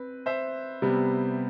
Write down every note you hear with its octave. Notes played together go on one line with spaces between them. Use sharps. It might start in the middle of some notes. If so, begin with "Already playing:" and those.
Already playing: C4 B4
C5 E5
C3 G3 B3